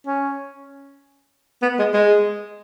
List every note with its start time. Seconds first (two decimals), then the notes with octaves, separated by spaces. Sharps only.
0.07 C#4
1.62 B3
1.78 G#3
1.94 G#3